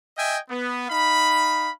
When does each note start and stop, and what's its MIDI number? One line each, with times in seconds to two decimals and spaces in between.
0.17 0.37 75
0.17 0.37 76
0.17 0.37 79
0.17 0.37 80
0.50 0.87 59
0.89 1.70 63
0.89 1.70 77
0.89 1.70 83